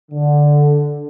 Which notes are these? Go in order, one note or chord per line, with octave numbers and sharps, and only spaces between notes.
D3